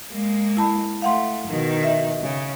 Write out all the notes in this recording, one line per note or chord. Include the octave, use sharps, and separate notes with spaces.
G#3 A#3
E4 A5 B5
A3 F5 F#5 C6
B2 D#3
D#5 E5
C#3